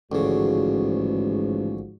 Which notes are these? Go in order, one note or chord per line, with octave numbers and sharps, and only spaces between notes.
A1 D2 G#2 C#3 F3 F#4